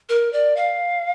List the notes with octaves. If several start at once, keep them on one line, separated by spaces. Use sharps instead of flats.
A#4
D5
F5